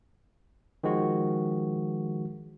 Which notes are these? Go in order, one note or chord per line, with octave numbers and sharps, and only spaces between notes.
D#3 F3 G#3 F#4